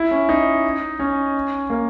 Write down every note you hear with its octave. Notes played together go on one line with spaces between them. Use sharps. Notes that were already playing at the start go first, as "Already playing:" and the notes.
Already playing: E4
C#4
D#4
C#4
A#3